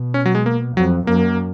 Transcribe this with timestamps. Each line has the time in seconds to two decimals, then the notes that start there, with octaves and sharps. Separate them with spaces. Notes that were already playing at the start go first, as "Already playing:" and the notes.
Already playing: B2
0.14 C#4
0.26 F#3
0.35 G#3
0.46 A#3
0.76 F2 F#3
1.07 F#2 A#3